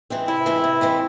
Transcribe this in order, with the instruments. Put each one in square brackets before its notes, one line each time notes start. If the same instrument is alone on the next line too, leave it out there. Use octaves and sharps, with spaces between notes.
[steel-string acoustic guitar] E3 G#3 C4
[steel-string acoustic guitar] C3 [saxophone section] E4
[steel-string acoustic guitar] E3 G#3 C4
C3
E3 G#3 C4